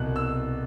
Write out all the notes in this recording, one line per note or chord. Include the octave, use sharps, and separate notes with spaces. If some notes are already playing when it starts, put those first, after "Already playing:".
Already playing: C2 B2 F#6
E6